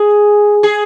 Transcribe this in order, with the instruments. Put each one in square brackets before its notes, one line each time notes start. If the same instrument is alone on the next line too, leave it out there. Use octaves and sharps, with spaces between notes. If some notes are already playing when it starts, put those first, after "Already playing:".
Already playing: [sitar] G#4
G#4